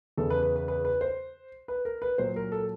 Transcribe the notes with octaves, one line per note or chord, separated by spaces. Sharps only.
E2 C#3 E3 A4
B4
B4
B4
B4
B4
C5
B4
A#4
B4
A#2 F#3 C5
A#4
A4